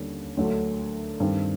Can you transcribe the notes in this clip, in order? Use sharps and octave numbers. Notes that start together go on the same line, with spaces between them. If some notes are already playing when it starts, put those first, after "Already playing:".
Already playing: D#2 D3 G3 A#3 C#4
D2 D3 F#3 A3 D4
G2 D#3 G3 C4